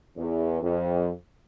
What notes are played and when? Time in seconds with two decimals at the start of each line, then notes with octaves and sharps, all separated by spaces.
0.17 E2
0.63 F2